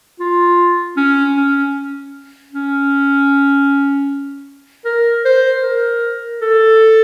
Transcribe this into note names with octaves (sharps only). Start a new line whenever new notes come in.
F4
C#4
C#4
C#4
A#4
C5
A#4
A4